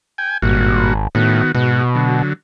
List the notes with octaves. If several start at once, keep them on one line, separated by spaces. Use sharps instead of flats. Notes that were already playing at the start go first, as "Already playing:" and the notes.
G5 G#5
G#1 G2 A#2 F#4
A2 D#3 B3 F#4
G#2 B2 F#4
D3 F#3